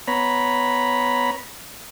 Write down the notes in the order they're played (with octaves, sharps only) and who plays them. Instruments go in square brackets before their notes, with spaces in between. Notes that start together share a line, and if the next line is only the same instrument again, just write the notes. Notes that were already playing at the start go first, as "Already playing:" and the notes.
[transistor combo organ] B3 C#5 A#5 B5